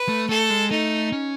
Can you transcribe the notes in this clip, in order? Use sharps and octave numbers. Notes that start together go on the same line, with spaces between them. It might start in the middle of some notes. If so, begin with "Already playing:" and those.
Already playing: B4
A3
A3 A4
G#3
A3 D#4
C#4